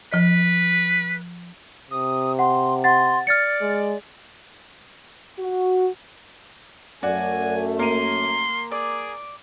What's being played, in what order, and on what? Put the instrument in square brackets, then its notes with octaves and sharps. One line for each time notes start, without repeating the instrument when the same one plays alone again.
[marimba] F3 D#5 [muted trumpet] B4
[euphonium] C3 [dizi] D#6
[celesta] F#5 [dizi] C6
[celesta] F#5 A6 [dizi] C6
[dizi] D5 [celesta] F6 A6 C#7
[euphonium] G#3
[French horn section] F#4
[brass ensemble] F#2 A3 [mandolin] F#4 [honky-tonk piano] D5 [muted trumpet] G#5
[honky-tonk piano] A#3 D#7 [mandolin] A#4 [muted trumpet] C6
[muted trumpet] G#4 [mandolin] D5